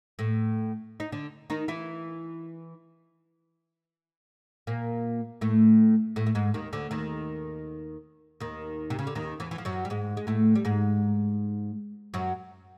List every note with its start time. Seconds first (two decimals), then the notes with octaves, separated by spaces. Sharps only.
0.19 A2 A3
1.00 D#4
1.12 D3 D4
1.50 D#3 D#4
1.68 E3 E4
4.67 A#2 A#3
5.41 A2 A3
6.16 A2 A3
6.26 A3
6.35 G#2 G#3
6.54 D#2 D#3
6.73 D2 D3
6.91 D#2 D#3
8.40 D#2 D#3
8.90 C3
8.99 C#3
9.07 D3
9.15 D#2 D#3
9.40 E2 E3
9.51 E3
9.58 F3
9.65 F#2 F#3
9.85 G3
9.90 G#2 G#3
10.17 G#3
10.27 A2 A3
10.55 G3
10.65 G#2 G#3
12.14 F#2 F#3